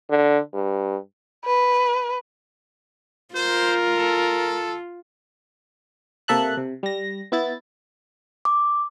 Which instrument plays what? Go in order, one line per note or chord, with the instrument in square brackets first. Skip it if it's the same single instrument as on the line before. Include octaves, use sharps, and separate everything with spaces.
[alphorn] D3
G2
[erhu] B4
[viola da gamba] F4 [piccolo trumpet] A#4 [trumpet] C5
[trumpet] A4
[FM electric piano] C3 A#3 A4 E5 A5 F#6
C3
G3 A#6
B3 E4 A6
[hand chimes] D6